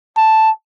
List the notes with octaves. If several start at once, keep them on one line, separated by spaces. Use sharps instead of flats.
A5